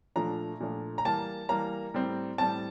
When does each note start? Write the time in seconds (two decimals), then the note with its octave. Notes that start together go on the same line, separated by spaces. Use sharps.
0.16 A#2 F3 A3 D4 A#5
0.60 A#2 F3 A3 D4
0.98 A#5
1.05 E3 G3 A#3 A5
1.49 E3 G3 A#3 A#5
1.94 A2 G3 C4
2.38 A2 G3 C4 A5